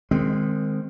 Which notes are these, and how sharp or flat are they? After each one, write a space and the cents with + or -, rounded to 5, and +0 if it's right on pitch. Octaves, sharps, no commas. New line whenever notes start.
D#3 -20 G#3 -10 C4 +0